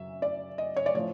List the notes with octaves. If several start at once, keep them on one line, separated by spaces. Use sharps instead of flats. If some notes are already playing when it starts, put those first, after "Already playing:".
Already playing: F#2 C#3 F#3 E5
D5
D#5
C#5
D5
A2 F3 C#5